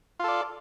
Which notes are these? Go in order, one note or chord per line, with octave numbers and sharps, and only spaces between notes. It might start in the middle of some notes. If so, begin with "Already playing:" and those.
F4 A4 D5